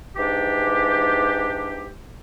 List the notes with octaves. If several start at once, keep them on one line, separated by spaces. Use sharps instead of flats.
G#2 E3 D4 G4